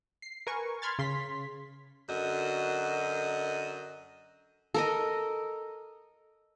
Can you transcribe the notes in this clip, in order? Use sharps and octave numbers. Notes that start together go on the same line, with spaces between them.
C7
A#4 B4 G#5 C#6
B5 C6 F6 G#6 A6
C#3 C6 B6
F#2 D3 F#4 A#4 D#5
A4 A#4 D#5